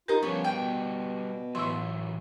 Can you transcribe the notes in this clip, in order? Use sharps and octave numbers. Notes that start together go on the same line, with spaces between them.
D#4 F4 G4 A#4 C5
F3 G3 B3 C#4 C#5
B2 G5
A2 E3 F#3 E5 C6 C#6 E6